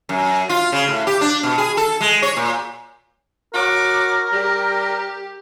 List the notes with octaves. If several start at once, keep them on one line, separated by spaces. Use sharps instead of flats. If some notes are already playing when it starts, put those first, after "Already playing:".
F#2
F4
C#3
A2
G4
D4
B2
G#4
A4
G#3
C#5
A#2
F#4 A#4 C#5 D6
G3 G4